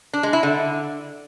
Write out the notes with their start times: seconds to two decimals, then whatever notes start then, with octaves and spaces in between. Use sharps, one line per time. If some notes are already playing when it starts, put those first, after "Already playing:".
0.13 D4
0.23 G#3
0.33 E4
0.43 D3